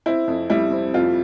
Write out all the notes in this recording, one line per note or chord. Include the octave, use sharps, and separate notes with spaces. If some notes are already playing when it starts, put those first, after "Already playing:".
C4 E4
F2
G3 E4
C4
F2 F4